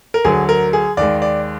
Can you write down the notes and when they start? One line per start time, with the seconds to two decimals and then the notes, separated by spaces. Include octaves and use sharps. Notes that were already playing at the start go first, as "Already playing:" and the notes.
0.14 A#4
0.25 D2 D3 F#3 G#4
0.49 A#4
0.73 G#4
0.97 D#2 D#3 G#3 D5
1.22 D5